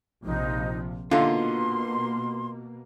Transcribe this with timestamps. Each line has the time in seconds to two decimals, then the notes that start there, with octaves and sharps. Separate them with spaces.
0.25 A#1 C3 F3 D#4
1.11 B2 D3 A#3 D#4 F4 C6